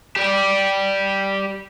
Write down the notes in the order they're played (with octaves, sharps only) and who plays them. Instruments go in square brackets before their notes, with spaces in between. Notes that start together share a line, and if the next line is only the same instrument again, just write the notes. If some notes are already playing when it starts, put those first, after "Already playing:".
[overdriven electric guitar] G4 D5